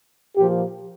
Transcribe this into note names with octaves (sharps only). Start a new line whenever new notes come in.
A#2 F3 G4